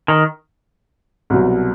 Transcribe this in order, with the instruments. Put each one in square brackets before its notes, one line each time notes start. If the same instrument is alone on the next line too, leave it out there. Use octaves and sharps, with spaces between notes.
[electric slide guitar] D#3
[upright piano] C2 B2 F#3